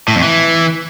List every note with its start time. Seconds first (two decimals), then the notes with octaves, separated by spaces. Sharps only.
0.08 A2
0.15 F2
0.22 E3